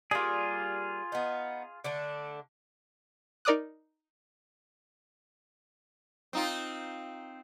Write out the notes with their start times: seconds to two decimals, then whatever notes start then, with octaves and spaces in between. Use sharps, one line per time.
0.11 G3 A#3 F4 G#4
1.12 B3 D#4
1.84 D3 A3 D4
3.45 D#4 A#4 D5 D6 D#6 F#6
6.33 C4 D#4 F4